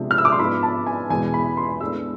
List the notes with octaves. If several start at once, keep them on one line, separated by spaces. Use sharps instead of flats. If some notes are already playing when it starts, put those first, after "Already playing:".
Already playing: C3 F3 G#3 B3 D4
F6
E6
D6
C6
G#2 F3 B3 D4 B5
A5
G#5
E2 B2 G#3 G#5
B5
C6
A2 G#3 B3 D4 E6